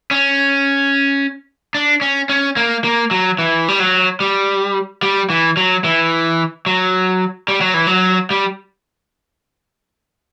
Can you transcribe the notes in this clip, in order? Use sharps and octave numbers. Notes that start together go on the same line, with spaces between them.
C#4
D4
C#4
C#4
A#3
A#3
F#3
E3
G3
F#3
G3
G3
E3
F#3
E3
F#3
G3
F#3
E3
F#3
G3